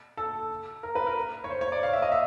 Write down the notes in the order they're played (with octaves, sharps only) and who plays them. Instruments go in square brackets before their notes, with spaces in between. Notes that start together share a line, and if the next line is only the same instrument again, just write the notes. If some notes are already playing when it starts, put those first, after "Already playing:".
[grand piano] A4
A#4
B4
A#4
C#5
C5
C#5
D5
F5
E5
D#5
E5